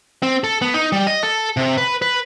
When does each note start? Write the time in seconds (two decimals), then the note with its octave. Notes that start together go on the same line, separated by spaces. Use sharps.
0.23 C4
0.44 A4
0.62 B3
0.74 D#4
0.92 G3
1.07 D#5
1.23 A4
1.57 C3
1.77 B4
2.02 B4